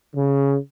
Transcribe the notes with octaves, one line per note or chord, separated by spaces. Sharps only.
C#3